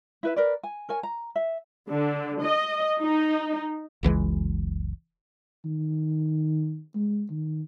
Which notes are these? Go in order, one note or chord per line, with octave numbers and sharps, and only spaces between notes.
E4 B4 E5
A#4 B4 D5
G#5
A#4 C#5 G#5
A#5
E5
D3
D#5
D#4
F#1 C#2 E3 G#3
D#3
G#3
D#3